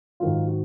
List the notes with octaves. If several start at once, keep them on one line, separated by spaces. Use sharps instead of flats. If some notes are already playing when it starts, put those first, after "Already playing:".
G#2 D#3 F#3 F4
F#4